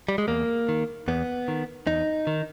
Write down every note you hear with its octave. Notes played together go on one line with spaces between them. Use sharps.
G3
G#3
E2 A#3
D#3
E2 B3
D#3
E2 D#4
D#3